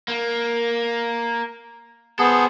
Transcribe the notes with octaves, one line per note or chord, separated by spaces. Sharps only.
A#3
B3 G#4 A4 C5